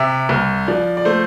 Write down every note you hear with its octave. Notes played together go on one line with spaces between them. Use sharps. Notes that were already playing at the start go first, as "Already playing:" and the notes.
Already playing: C3 E5
C2
F3 D5
D5
A3 C5